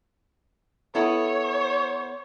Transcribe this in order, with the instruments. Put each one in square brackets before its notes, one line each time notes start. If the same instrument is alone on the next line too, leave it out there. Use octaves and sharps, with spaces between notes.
[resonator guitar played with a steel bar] B3 E4 A4 [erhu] C#5